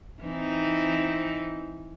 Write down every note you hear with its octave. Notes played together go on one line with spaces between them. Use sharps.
E3 C4 D#4